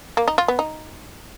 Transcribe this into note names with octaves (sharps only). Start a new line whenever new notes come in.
A#3
D#4
F4
B3
D#4